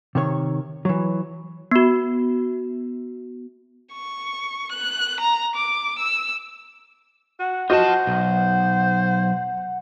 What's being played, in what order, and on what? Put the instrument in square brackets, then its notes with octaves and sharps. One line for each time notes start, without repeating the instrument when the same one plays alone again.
[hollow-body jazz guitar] C3 D#3 C#5
E3 F#3
[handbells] B3 F#4
[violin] C#6
F#6
A#5
D6
E6
[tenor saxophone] F#4 [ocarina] F#5
[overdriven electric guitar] F4 A5 [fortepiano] F#4 D#5 [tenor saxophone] C5
[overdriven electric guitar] B1